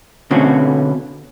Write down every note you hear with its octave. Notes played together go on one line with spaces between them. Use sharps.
B2 D3 A3 C4 C#4 F#4